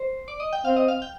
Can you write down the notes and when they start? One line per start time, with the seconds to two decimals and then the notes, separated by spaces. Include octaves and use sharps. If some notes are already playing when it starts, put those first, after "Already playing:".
Already playing: C5
0.28 D5
0.40 D#5
0.53 G5
0.65 C4 F5
0.77 D#5
0.88 F5
1.02 G5